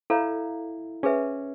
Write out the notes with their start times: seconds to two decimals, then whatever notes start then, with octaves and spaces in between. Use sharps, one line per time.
0.10 E4 A4 C#5 F5 A#5
1.03 C#4 G#4 B4 E5